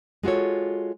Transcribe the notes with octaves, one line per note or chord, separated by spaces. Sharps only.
G#3 F4 F#4 A4 C#5